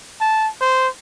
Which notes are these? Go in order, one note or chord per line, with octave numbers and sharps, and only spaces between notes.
A5
C5